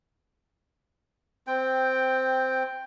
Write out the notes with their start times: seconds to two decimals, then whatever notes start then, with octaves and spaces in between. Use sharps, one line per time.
1.47 C4 G5